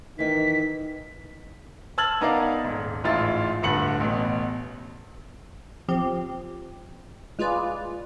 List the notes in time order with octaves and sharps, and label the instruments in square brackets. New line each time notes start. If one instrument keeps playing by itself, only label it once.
[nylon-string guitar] D#3 E3 [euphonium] D#4 [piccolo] B6
[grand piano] A5 E6 F6 G#6 A6 F#7
B3 D#4 A#4 D5 F5
D#1 G#2
A1 G#2 E4 F4 A6
D1 G2 D3 C#7 F#7
A1 B2
[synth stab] F3 C4 G4
G#3 F4 G#4 B4 D5